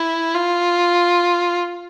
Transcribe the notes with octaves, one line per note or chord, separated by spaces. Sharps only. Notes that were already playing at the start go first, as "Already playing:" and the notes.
Already playing: E4
F4